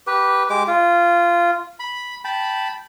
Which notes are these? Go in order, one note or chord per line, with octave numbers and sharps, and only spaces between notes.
G4 B4
G#3 G4 D6
F4
B5
G5 A5 B5